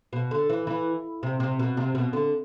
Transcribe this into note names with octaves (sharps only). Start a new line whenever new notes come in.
B2
D3
E3
E3
C3
C3
B2
C3
B2
D3